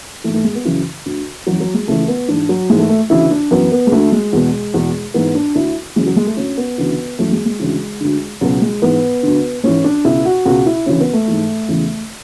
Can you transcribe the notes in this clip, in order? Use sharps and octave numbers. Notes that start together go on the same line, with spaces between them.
G#2 E3 A3
A3
G#3
B3
F#2 C#3 E3
D2 D3
F#2 E3 F#3
F#3
G#3
C#2 C#3 E3 A3
B3
G#2 E3 D4
F#3
G#2 E3 G#3
A3
A3
D2 C#3 E3 E4
D4
F#2 E3 B3
B3
G#3
D2 D3 A3
G#3
E2 B2
E2 B2
G#2 E3 B3
D4
D2 D3 E4
F#2 C#3 E3 G#3
F#3
G#3
A3
D2 D3 C#4
B3
D2 C#3 E3
F#2 E3 A3
G#3
G#3
D2 C#3 E3
D2 D3
C#2 B2 F#3
G#3
G#2 E3 B3
D2 D3
G#2 E3 C#4
D4
C#2 B2 E4
F#4
C#2 B2 F#4
E4
D2 C#3 E3 C#4
B3
A3
G#2 E3
E2 C#3 E3